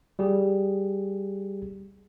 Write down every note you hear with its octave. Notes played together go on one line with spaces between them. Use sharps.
G3 G4 G#4